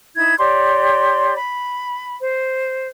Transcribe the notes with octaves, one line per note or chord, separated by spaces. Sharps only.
D#4 E4 G#6
G4 C#5 D5 C6
B5
C5